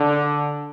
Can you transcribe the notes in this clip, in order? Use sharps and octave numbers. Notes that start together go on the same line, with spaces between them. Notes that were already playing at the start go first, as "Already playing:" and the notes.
Already playing: D3